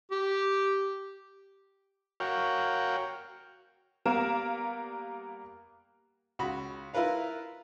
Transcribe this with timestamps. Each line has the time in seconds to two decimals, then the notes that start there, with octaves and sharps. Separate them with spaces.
0.11 G4
2.20 F#4 A#4 C#5 F5 G5
4.06 G3 A#3 B3 A#4 F5 E7
6.39 C#2 F#4 B5
6.94 E4 F4 A#4 B4 F5